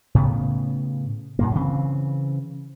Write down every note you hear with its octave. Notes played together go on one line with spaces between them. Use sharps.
A2 C#3 B3
F#2 A#2 A#3
C#3 E3 C4